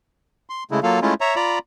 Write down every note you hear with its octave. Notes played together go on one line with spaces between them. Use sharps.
C6
C#3 G#3 A3 E4
F#3 A#3 F4 A4 F5
G#3 A3 C#4 E4 F4
C#5 E5 A#5
F4 D5 A#5 B5